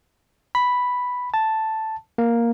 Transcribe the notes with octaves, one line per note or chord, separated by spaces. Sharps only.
B5
A5
A#3